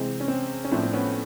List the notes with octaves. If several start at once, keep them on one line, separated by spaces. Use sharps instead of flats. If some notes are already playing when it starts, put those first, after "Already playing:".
Already playing: C3 E3 G#3 C4
C#4
C4
C#4
A2 F3 A3 C4 D4
C4
B3 C#4